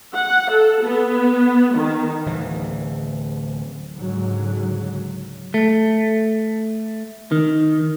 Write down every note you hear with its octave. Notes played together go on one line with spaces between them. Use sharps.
F#5
A4
B3
D#3
D1 E3
C#2 G#2 D3 F#3
A3
D#3